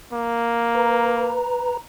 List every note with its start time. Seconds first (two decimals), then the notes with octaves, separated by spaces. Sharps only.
0.13 A#3
0.75 B4 A#5